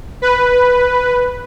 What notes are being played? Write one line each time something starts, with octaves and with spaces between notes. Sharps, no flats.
B4